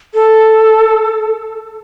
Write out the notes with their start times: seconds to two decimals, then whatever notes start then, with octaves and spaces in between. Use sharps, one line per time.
0.14 A4